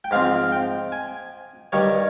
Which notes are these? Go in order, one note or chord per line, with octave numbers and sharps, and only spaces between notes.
G5
G#2 F3 C4 F5
G5
G#5
G2 D#3 G3 C#5